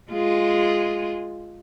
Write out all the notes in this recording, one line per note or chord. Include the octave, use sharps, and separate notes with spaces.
G#3 F4 G#4